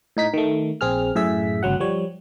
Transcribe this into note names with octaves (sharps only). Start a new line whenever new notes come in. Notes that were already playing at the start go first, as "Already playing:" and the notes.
A2 D#4 B6
D#3 A3
A#1 C4 G#4 F6
F#2 A2 G#4 E5 B6
G1 C#2 F#3 F#5
F3 G3 C#5